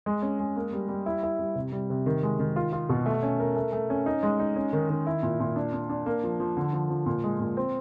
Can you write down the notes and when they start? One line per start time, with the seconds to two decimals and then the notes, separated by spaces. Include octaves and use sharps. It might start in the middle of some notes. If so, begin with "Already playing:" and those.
0.06 G#3
0.22 C#4
0.40 G#3
0.56 A#3
0.73 G3
0.89 G3
1.06 E4
1.23 E4
1.39 G3
1.55 C3
1.72 G3
1.90 C3
2.06 D#3
2.23 G#3
2.39 D#3
2.56 F4
2.73 F4
2.89 B2
3.06 A3
3.23 C#4
3.39 A#4
3.56 A3
3.73 A3
3.90 C#4
4.06 D#4
4.23 G#3
4.39 D#4
4.56 C#4
4.73 D#3
4.90 D#3
5.07 E4
5.23 A#2
5.40 A#2
5.56 D4
5.73 D4
5.90 D4
6.06 A#3
6.23 F3
6.40 F3
6.57 D3
6.73 F3
6.90 F3
7.06 A#2
7.24 G#3
7.40 A#2
7.57 C4